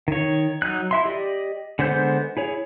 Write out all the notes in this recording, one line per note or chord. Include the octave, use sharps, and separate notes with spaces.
D#3 C#5
F#3 D#4 F#6
E4 E5 C6
G4 D5 D#5
D3 G#3 B3 C5 G6
E4 G#4 C#5